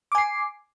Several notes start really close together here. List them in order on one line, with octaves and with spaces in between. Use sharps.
D6 G#5 C7